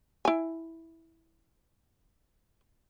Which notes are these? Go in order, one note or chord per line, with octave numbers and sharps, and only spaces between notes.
E4 G#5